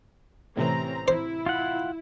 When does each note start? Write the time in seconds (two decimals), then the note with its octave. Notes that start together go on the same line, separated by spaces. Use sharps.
0.57 A2 C3 E3 C4 C#4 A#5
1.08 E4 C5
1.46 F4 F#5